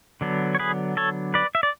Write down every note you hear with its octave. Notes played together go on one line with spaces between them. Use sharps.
D3 F#3 B3 D4
C#5
G#4 B4
A4 C#5
B4 D5
E5
D5